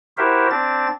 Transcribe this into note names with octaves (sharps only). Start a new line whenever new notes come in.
E4 F#4 G4 A#4 C5 E5
C4 D4 A6